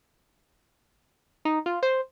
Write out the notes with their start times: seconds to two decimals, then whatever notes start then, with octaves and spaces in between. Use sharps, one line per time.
1.45 D#4
1.66 F4
1.83 C5